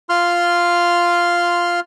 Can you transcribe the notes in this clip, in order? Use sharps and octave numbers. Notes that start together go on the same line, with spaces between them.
F4 C6 F6